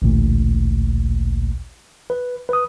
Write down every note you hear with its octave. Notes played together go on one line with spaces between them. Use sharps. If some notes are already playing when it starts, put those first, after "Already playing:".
A1 D2 A#2
B4
B4 D#6